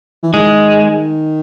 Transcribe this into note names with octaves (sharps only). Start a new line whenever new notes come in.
E3
D#3 G#3